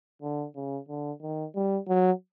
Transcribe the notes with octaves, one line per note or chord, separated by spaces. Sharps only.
D3
C#3
D3
D#3
G3
F#3